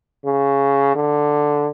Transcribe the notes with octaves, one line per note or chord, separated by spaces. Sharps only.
C#3
D3